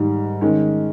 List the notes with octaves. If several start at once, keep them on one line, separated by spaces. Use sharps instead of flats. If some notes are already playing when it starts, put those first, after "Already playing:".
Already playing: G#2 D#3 G3
D#3 G#3 C#4